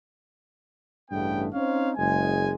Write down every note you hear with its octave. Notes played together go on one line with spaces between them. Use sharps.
A1 G2 C#3 A3 B3 G5
C4 C#4 D#4 C5 C#5 F5
F#1 G#3 G#5